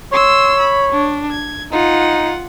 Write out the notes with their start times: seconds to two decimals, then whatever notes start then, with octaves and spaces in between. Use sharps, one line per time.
0.13 C#5 C6 E6
0.60 B5
0.92 D4
1.31 G#6
1.72 D#4 F4 F#5